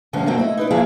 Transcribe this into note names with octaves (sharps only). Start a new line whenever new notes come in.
D2 G2 D3 F3 C#4
F2 B2 F#3 A#3 C4 D4
A3 E4 D#5
D#4 B4 D5
F3 A#3 E4 G#4 D5 F5